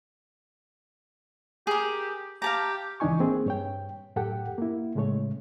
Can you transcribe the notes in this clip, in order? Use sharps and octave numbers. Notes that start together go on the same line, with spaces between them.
G4 G#4 A#4
G4 F5 A5 A#5
C#2 E3 D4 D#4 G#5 C#6
A#3 C4 G#4
G2 C#5 G5
F#2 A2 G4 A4 F#5 G5
A#3 E4
A2 C#3 G#3 A3 C#5